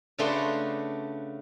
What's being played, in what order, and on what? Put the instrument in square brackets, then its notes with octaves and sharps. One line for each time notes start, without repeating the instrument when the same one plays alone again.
[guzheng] C#3 A3 D4 F#4 B4 C6